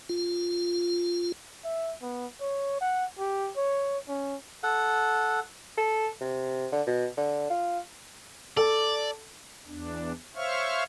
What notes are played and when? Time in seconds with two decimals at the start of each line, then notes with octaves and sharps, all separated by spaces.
0.09 F4
1.64 E5
2.02 B3
2.41 C#5
2.81 F#5
3.19 G4
3.57 C#5
4.08 C#4
4.63 A4 F#5
5.78 A4
6.21 C3
6.72 D3
6.87 B2
7.17 D3
7.50 F4
8.57 A4 D5
9.67 E2 D4
10.35 C5 C#5 E5 F5 C#6 F6